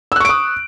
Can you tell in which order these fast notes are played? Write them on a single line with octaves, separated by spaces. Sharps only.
E6 F#6 C#6 D7 D#6